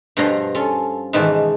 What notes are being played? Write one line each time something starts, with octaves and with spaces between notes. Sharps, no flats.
G2 B2 F3 C#5 A#5 C6
C#4 F4 A4
G#2 B2 D#3 E3 A5